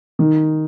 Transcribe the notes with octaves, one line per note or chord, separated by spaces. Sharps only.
D#3